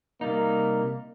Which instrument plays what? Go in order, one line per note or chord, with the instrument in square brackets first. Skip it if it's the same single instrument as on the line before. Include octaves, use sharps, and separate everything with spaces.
[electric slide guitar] C3 G3 D#4 [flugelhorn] A#3